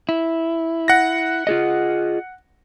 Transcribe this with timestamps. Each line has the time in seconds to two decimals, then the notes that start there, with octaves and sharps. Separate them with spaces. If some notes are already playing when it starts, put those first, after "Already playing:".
0.09 E4
0.88 F#5 A#6
1.47 F4 G#4 D#5